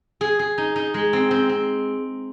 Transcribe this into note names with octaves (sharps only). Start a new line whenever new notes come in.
G#4
G#4
D#4
D#4
G#3
C4
C4
C4